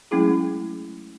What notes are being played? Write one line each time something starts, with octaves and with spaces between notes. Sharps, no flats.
F#3 G#3 A3 C#4 E4 G#4